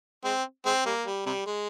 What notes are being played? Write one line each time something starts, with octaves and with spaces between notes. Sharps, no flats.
G#3 C4
G#3 C4
G3 A#3
G3
C3 G3
G#3